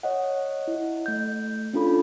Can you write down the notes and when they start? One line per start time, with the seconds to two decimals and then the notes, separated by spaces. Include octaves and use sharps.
0.03 C#5 D#5 F#5
0.68 E4
1.06 A3 G6
1.73 C#4 D4 F4 A4 B5